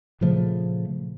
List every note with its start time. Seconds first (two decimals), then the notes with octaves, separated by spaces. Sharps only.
0.21 A#2 C#3 F3 A3